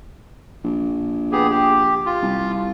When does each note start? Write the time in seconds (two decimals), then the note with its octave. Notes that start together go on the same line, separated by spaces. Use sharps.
0.64 A#1
1.32 B3 G4 G#4
1.50 G4
2.06 F4
2.22 C2